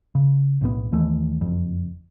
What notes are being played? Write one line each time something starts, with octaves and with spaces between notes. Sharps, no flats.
C#3
B1 A2 E3 B3
D#2 D#3 E3 A3
F#1 F2